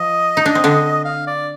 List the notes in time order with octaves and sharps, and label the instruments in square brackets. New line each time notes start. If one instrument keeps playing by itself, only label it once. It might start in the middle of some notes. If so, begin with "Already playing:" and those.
Already playing: [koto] F3 [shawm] D#5
[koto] D#4
D4
C4
D3 D4
[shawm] F5
D5